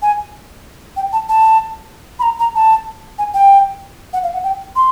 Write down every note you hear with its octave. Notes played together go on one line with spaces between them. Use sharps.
G#5
G5
A5
A5
B5
A#5
A#5
A5
G#5
G5
F#5
F5
F#5
G5
C6